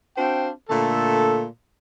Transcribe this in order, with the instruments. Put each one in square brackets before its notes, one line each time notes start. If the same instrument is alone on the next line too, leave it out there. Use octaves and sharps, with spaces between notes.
[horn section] C4 D4 F#4 C5 F5 G5
A#2 D3 A3 A4